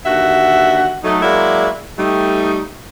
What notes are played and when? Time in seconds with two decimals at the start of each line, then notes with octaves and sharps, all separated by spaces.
0.06 D#2 D3 F#4 E5 F#5
1.04 F#3 A3 D#4
1.22 F#3 G#3 A#3 E4 F#4 D5
1.97 G3 A3 D#4